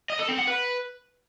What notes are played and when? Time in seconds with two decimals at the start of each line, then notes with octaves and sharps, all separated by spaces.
0.10 D#5
0.19 A4
0.29 C4
0.38 F#5
0.47 B4